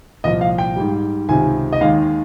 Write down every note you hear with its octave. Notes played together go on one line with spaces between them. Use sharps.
C2 A#2 F3 D#5
F5
G5
G#2 G3
C#2 C3 D#3 G#5
D#5
D#2 D#3 G#3 F5